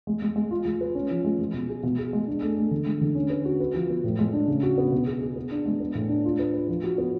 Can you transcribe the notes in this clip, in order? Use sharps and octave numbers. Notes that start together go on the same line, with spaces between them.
G#3
G#3
G#3
F4
G#3
B4
C#4
F3
G#3
G#3
B2
G#4
B2
G#4
G#3
D4
A3
A3
D3
G#3
D3
C#4
B4
F#4
B4
F3
B3
A2
G#3
D4
C#3
F#4
B3
B2
G#4
G#4
B3
D4
G#3
B3
A2
D4
F4
B4
B4
F3
F#4
B3